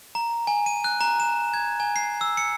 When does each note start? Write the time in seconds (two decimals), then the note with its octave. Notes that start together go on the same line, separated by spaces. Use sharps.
0.15 A#5
0.47 G#5
0.66 D#7
0.84 F#6
1.01 A#5
1.20 E7
1.54 G#6
1.80 G#5
1.96 C7
2.21 E6
2.37 C#7